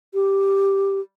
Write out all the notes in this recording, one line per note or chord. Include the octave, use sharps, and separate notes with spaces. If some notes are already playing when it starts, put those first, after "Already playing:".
G4